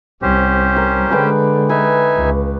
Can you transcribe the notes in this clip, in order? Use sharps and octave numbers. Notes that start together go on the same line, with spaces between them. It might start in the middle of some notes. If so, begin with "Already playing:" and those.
C2 C#4 G4 C5
A#4
D3 G#3 G#4 B4 G5
D#4 B4 E5 G#5
C#2